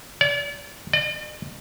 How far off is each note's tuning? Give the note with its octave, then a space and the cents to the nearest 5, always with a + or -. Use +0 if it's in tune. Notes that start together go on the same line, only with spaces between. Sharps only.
D5 -40
D5 +45